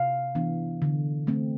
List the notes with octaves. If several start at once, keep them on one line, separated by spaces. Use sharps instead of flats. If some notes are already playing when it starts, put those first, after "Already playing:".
Already playing: C3 F5
E3 B3 D4
D3
A3 C4